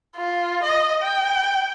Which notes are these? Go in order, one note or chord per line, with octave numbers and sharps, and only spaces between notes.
F4
D#5
G5